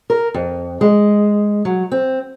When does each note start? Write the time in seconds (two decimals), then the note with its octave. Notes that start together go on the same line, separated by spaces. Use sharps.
0.10 A#4
0.34 F2
0.81 G#3
1.65 F#3
1.92 C4